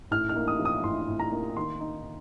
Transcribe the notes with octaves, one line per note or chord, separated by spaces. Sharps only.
A2 F6
F6
A#3
D#6
F3
D#6
A2 C6
A2
A#5
A#3
D#3 C6
D#4